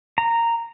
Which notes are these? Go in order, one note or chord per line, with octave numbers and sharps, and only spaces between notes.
A#5